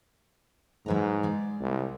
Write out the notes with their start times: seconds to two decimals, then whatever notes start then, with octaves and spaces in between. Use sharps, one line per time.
0.86 G#2 F#3 B4 A#5
1.23 G#3 D5
1.61 C2